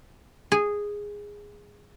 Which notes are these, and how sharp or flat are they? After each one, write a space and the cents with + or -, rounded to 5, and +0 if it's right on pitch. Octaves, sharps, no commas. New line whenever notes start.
G#4 -10